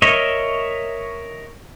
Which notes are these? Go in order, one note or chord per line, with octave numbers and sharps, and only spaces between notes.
A#4 C#5 D#5 E5